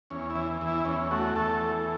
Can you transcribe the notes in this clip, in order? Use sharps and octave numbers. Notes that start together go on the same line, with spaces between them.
E2 C#4
E4
E3
E2
E4
E2 C#4
A3 F#4
E2 A4
E3